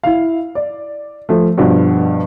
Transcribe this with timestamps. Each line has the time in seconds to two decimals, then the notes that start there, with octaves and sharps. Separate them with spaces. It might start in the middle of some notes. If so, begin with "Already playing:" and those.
0.03 E4 F5
0.55 D5
1.29 F3 A3
1.57 G2 B2 F3 G3